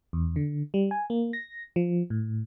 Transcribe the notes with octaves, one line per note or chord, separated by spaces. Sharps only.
E2
D3
G3
G#5
A#3
A#6
F3
A2